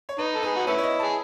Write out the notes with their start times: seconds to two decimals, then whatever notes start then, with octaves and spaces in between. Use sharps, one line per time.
0.09 C#5
0.18 D#4 B4
0.35 A4
0.43 G#4 B4
0.56 F#4
0.67 A3 C#4 E4 B4
0.78 C#5
0.84 D#5
1.00 G#4 A5